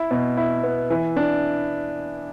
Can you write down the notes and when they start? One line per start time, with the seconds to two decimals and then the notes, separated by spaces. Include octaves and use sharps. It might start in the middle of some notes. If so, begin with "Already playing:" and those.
Already playing: E4
0.11 B2
0.37 E4
0.63 B3
0.90 E3
1.17 D4